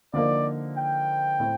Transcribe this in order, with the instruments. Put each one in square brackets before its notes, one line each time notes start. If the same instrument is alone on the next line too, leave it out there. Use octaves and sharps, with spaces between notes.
[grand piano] D3 F3 A#3 D#4 A#4 [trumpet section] D5
[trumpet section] G5
[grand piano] A2 A3 C4